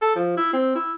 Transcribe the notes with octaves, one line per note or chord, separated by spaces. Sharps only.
A4
F3
E4
C4
E4